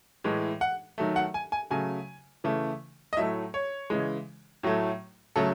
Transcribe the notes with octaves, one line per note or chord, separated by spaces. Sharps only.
A2 E3 G#3
F#5
D#3 F#3 A3
F#5
G#5
G#5
C#3 F#3 A3 G#5
C#3 E3 A3
D#5
A2 F#3 A3 E5
C#5
C#3 E3 G#3
A2 F#3 A3
C#3 F#3 A3 A4